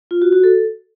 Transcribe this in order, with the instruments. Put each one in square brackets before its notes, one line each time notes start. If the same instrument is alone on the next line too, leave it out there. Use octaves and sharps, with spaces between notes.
[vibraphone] F4
F#4
F#4
A4